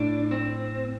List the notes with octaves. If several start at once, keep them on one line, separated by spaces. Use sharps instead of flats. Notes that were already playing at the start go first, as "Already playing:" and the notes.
Already playing: A2 D4
C4